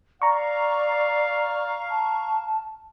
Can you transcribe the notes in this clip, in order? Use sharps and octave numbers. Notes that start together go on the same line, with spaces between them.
D5 F5 A#5 C#6
A5